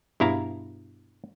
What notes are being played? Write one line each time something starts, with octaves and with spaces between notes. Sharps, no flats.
G2 B2 E4 F5 A#5